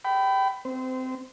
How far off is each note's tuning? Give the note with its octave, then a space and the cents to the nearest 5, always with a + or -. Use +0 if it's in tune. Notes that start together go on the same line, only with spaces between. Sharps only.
G5 -20 B5 +20
C4 -20 C5 -30